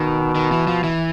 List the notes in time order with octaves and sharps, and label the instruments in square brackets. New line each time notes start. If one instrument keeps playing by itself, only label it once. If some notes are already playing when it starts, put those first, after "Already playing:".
Already playing: [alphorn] B2 [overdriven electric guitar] D#3
[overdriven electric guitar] D#3
E3
F3
E3